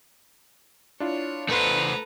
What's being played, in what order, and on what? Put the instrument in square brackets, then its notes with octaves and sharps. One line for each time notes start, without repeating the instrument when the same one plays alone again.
[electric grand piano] D4 E4 F4 [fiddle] C#5
[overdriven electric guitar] A3 C5 [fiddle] A4 A#5 [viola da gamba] B4